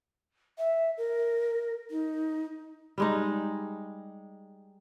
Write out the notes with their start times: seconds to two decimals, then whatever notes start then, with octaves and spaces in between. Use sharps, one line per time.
0.58 E5
0.98 A#4
1.91 D#4
2.98 G3 G#3 D#4